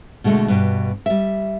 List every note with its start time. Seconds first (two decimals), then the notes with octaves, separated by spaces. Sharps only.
0.24 B2 D3 G#3 A3
0.48 G2 B2
1.06 G3 E5